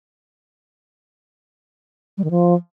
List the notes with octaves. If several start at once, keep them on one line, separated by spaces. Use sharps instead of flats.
G3
D#3
F3